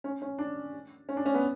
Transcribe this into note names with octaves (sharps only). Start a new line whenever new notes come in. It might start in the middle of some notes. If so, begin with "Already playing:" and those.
C#4
C#4
D4
C#4
D4
C#4
B3